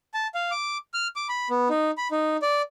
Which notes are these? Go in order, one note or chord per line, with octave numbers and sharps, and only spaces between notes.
A5
F5
D6
F6
D6
B5
B3
D#4
B5
D#4
D5